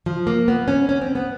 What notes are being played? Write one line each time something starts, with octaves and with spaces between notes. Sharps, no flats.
F3
A#3
B3
C#4
C#4
C4
B3